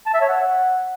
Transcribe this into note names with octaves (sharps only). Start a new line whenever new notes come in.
A5
E5
C#5
F#5